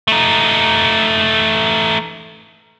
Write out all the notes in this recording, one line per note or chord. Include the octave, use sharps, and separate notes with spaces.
A3 D#4